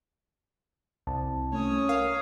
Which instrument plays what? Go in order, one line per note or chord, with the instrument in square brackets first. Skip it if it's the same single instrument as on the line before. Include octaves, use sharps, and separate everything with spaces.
[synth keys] C2 [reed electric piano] A5
[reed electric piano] A3 [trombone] C#4 [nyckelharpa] C#5 D#6
[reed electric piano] A#4 [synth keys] F5